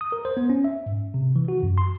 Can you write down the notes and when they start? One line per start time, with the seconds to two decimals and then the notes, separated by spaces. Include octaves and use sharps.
0.01 D#6
0.12 A#4
0.25 C5
0.37 B3
0.50 C#4
0.64 E5
0.86 G#2
1.14 C3
1.36 E3
1.48 F#4
1.63 F#2
1.78 C6